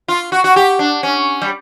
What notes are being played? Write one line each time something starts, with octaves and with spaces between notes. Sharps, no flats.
F4
F#4
F#4
G4
D4
C#4
G3